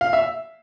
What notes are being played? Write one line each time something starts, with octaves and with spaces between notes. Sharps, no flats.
F5
E5